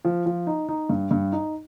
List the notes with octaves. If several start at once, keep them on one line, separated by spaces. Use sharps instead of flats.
F3
F3
D#4
D#4
G2
G2
D#4